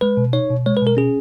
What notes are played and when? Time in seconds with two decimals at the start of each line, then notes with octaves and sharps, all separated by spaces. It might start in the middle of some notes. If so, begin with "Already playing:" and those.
0.01 G#3 B4
0.17 B2
0.33 D#4 C#5
0.50 B2
0.66 G#3 C#5
0.77 B4
0.82 B2 A#4
0.97 C#4 G#4